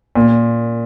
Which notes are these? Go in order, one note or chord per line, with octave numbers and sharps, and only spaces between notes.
A#2